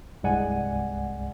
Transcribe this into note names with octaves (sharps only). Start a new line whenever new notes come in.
C2 G2 G#3 D5 F#5 G#5